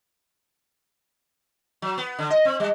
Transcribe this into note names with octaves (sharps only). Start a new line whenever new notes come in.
F#3
B3
D3
D#5
C4
G3